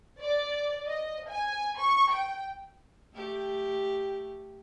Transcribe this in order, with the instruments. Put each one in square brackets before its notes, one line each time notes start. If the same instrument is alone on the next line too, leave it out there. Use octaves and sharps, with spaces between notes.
[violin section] D5
D#5
G#5
C#6
G5
[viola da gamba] A3 G4